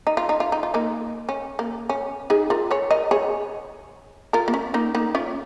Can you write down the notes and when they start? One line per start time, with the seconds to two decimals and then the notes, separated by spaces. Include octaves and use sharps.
0.07 D#4
0.17 F4
0.29 D#4
0.40 F4
0.52 D#4
0.63 F4
0.74 A#3 D#4
1.29 C#4
1.59 A#3
1.89 C#4
2.30 D#4 G#4
2.50 F4 A#4
2.71 G#4 C#5
2.91 A#4 D#5
3.11 G#4 C#5
4.33 F4 A#4
4.48 A#3
4.54 C#4
4.74 A#3 D#4
4.95 A#3 D#4
5.15 C#4 F4